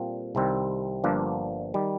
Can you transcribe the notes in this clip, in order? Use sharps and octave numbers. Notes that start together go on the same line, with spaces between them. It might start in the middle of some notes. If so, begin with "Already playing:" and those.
Already playing: A#2 G3 C4 F4 A4
C2 C3 D#3 G3 C4
G1 G2 F3 A#3 D4
D#3 G3